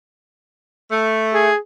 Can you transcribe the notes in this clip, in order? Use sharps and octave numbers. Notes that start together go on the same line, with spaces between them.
A3
G#4